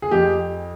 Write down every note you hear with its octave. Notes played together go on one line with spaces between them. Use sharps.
G#4
F2 G4